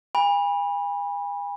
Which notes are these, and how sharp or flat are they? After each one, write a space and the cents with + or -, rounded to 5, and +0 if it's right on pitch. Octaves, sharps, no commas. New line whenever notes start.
G#5 -40 B5 -20